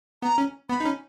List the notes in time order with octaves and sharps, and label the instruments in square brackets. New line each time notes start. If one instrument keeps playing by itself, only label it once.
[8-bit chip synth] B3 [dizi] A#5
[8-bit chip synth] C#4
[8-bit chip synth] B3 [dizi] B5
[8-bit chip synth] D#4
C#4